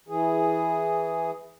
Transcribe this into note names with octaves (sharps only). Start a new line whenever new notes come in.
E3 G#4